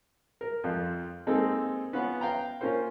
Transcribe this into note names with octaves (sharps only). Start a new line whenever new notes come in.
A#4
F2 F3
G#3 A#3 C4 D#4 A4
B3 C#4 F4 F#5
F5 G5 A#5
A#3 C#4 F4 A#4 C5